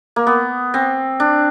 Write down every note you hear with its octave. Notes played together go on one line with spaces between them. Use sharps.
A#3
B3
C4
D4